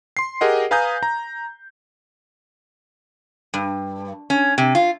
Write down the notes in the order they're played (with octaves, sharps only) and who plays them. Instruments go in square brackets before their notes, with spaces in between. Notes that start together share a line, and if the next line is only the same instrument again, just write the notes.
[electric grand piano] C6 C7
G4 G#4 A#4 D#5 F#5
B4 F5 G#5 A#5 D#6 G6
A#5
[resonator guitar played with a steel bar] G2
C#4
C3
F4